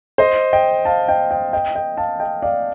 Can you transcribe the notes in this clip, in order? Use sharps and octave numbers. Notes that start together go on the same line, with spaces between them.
C5 D#5
D#5 G5
F5 A5
D#5 G5
D#5 G5
D#5 G5
D#5 G5
F5 A5
D#5 G5
D5 F5